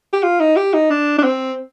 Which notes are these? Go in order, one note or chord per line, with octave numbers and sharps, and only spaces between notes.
G4
F4
D#4
G4
D#4
D4
D4
C4